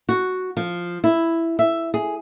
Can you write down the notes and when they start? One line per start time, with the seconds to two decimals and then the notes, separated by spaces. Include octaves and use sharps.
0.09 F#4
0.57 F3
1.04 E4
1.59 E5
1.94 G#4